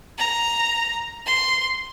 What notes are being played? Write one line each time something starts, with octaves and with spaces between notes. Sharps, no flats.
A#5
C6